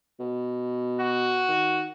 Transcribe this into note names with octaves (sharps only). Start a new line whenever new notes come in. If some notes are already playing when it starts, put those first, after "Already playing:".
B2
F#4
D#3